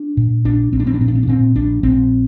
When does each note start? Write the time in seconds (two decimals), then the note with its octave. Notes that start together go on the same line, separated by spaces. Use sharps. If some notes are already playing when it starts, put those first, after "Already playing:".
Already playing: D4
0.17 A#2
0.45 A#1 D4
0.72 A#1 C4
0.80 D4
0.87 C4
0.94 D4
1.01 A#2 C4
1.08 D4
1.15 C4
1.23 D4
1.28 A#2 C4
1.55 A#1 D4
1.83 A#1 C4